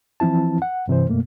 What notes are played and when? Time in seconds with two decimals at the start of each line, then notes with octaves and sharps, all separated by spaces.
0.20 E3 F3 C4 E4 A5
0.62 F#5
0.88 G2 C3 E3 C5
1.07 F#2 B2 A3 A#3